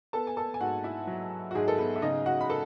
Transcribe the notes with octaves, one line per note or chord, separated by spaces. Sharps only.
B3 A4 A5
G#5
A4 A5
G#5
G#2 F#4 F#5
E4 E5
F#3
F#4
G#2 G#3 G#4
A4
B3 B4
E5
C#3 D#4 D#5
F#4 F#5
B5
A4 A5